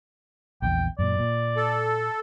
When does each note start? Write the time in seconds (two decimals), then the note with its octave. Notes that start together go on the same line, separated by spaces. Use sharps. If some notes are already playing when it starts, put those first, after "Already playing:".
0.62 A#1 E2 G5
0.99 F#2 A#2 D5
1.19 A#2
1.57 A4